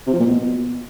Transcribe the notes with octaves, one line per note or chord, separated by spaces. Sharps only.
C3
F3
A#2
B2